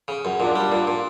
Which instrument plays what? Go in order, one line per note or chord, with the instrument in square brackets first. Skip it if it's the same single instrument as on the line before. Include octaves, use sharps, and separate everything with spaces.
[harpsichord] C#3
F#2
[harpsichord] A#2 [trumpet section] D4
[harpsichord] G3
A#2
A#2